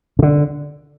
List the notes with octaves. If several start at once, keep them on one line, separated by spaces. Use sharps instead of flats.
C#3
D3